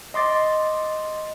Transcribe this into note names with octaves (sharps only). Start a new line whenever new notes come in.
D#5 C6 D6 A6